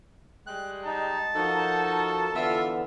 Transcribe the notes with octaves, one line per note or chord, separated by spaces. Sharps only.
G3 G#3 G5 F#6
D#4 A5
F3 D#4 F#4 A4 A#4
D3 E3 B3 F4 E5